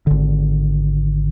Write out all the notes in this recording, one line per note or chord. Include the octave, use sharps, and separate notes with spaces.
G#1 D3